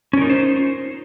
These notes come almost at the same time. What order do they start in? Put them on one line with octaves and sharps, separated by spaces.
C#4 A#4 D#4 F4 C5